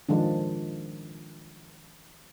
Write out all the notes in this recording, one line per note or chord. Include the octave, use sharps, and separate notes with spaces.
D#3 F3 G#3 D4